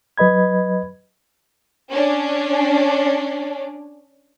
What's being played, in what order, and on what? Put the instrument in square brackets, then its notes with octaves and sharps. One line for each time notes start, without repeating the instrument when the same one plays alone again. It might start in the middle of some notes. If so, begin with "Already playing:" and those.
[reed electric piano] F#3 B4 D#5 B5 G#6
[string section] C#4 D4